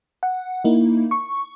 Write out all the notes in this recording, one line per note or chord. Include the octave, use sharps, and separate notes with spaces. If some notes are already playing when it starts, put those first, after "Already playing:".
F#5
A#3 D#4 E4
C#6